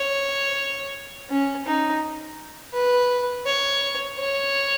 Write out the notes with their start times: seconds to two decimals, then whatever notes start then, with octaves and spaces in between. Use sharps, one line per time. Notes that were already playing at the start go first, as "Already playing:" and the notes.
Already playing: C#5
1.30 C#4
1.66 D#4
2.73 B4
3.46 C#5
4.19 C#5